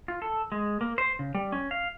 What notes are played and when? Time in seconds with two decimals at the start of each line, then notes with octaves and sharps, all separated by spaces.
0.08 F4
0.22 A4
0.52 G#3
0.81 A#3
0.98 C5
1.19 C#3
1.35 G3
1.52 C#4
1.71 F5